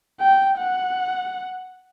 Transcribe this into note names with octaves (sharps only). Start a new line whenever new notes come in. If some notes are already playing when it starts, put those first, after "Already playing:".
G5
F#5